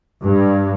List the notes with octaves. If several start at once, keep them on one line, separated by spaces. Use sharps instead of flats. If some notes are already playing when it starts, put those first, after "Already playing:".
G2